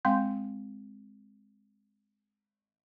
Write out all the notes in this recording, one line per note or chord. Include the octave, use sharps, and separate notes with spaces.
G#3 C4 F5 G5 C6 G6